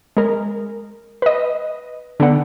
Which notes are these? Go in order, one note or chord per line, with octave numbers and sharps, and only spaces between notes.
G#3 A#4
B4 D#5
D3 B3 F#5